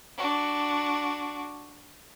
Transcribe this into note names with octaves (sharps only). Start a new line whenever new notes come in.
D4 F#4